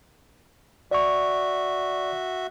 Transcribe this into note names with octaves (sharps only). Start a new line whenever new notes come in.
F#4 D5 E5 C#6